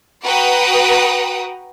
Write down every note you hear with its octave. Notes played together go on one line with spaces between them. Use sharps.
F#4 B4 F#5 G5 A#5 D#6